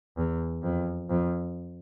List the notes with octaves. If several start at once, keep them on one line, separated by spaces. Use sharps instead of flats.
E2
F2
F2